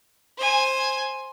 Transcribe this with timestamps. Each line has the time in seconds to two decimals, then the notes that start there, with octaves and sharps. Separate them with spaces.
0.38 C5 G#5